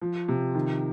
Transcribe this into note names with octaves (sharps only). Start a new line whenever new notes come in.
F3
C3
D#3